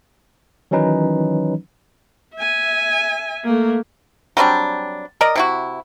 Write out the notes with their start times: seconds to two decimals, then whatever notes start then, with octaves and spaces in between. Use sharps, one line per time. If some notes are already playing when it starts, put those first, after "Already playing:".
0.71 D#3 E3 F#3 C#4 D#4 B4
2.35 E5 G#5
3.44 A3 A#3
4.37 F#3 G3 C4 D4
5.21 A#4 D5 D#5
5.36 C3 E4 F#4